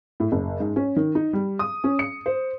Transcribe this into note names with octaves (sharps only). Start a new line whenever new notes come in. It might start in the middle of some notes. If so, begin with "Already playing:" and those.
A2
F#1
G#2
C#4
D#3
D#4
G3
D#6
C#4
C#7
C5